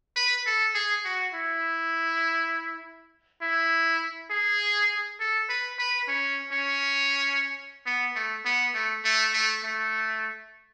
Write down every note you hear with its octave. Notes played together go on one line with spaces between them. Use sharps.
B4
A4
G#4
F#4
E4
E4
G#4
A4
B4
B4
C#4
C#4
B3
A3
B3
A3
A3
A3
A3